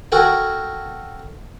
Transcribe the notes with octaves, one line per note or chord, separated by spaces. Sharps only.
F#4 A4 A#4 G5 G#5